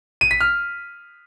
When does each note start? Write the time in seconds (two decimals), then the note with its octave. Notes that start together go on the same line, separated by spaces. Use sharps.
0.21 D#7
0.31 B6
0.41 F6